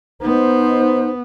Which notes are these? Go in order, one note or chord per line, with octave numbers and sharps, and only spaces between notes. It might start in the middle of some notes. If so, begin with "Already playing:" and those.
B3 D#4 C5